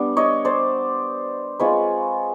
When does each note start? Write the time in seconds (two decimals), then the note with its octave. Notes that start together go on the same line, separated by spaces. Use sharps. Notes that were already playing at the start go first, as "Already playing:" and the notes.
Already playing: G3 B3 D4
0.17 C#5 D#5
0.45 C5 D5
1.60 G#3 C4 F4 B4 C#5